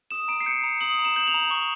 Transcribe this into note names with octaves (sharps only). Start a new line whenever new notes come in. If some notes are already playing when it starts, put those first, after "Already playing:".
D#6 E7
A#5 D7
C7
G6 C#7
A#5
D#6 F#7
A#5
E7
G6 F#7
F7
A#5
C#6